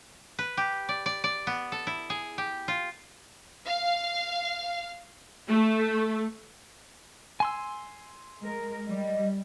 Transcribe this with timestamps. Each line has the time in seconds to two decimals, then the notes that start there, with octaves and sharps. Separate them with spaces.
0.39 B4
0.57 G4
0.89 D5
1.06 D5
1.24 D5
1.47 B3
1.72 A4
1.87 E4
2.10 G#4
2.38 G4
2.68 F4
3.66 F5
5.49 A3
7.40 G#5 C6 E6
8.41 G#3 A#4
8.87 G3 D#5